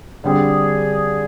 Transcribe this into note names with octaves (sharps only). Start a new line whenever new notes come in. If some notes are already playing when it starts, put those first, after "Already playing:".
D3 G3 C4 G#4